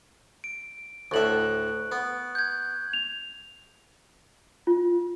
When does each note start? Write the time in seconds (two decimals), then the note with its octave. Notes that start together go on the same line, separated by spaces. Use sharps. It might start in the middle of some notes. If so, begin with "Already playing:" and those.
0.44 D7
1.11 D2 A2 E5 C#6 F#6 F#7
1.92 B3
2.35 G6 G#6
2.93 F7
4.67 F4